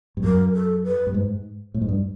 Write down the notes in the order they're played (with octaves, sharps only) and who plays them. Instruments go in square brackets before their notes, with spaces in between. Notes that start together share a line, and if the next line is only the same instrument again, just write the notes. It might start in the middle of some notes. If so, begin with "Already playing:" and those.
[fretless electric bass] G2
[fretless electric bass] F#2 [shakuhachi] A#4
[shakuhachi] A4
B4
[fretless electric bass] G2
G#2
A2
G#2
G2